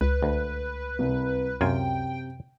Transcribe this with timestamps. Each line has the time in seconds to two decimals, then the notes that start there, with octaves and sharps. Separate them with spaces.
0.01 C#2 B4
0.23 D2
0.99 C2
1.61 F#2 C3 F4 G5 G#5